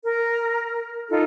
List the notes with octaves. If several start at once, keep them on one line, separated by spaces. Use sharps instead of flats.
A#4
D#4 F4 A4